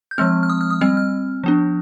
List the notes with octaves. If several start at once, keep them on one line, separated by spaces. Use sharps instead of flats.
G6
F3 G#3 C4 F6
F6
D#6
F6
D#6
G3 C4 F6
F6
F3 B3 D4